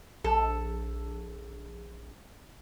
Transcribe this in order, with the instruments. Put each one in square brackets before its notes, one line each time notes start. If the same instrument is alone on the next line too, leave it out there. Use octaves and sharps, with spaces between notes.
[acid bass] A#1 [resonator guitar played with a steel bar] A4